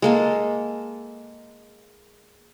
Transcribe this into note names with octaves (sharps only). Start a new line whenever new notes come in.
G#3 A#3 A4